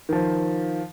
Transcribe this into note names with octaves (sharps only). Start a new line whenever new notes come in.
D#3 F3